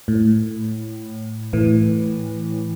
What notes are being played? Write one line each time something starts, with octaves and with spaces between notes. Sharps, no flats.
A2
A2 E3